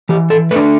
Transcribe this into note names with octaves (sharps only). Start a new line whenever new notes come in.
E3 G4
A4
A3 D4 B4